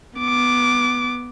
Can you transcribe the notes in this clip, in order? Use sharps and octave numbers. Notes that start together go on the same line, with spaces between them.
B3 D6